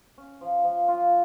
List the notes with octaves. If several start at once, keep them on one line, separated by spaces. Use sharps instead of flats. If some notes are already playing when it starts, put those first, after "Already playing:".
C#4
F3
F3
F4